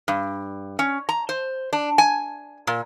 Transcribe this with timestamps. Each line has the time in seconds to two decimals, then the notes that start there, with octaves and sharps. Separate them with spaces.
0.08 G2
0.79 C#4
1.09 A#5
1.29 C5
1.73 D4
1.98 G#5
2.67 A#2